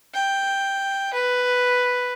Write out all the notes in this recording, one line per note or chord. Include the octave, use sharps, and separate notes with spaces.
G5
B4